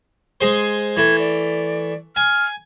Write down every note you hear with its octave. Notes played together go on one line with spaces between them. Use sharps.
G#3 G#4 C5
E3 A3 G#6
D5
G#5 F6